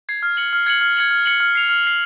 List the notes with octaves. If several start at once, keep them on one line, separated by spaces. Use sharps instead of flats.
G#6 C7
F6
G#6 C#7 F#7
F6
G#6 C#7 F#7
F6
G#6 C#7 F#7
F6
G#6 C#7 F#7
F6
C7 F7
F6
C7 F7